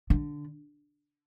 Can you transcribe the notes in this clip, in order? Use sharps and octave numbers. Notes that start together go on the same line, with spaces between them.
D3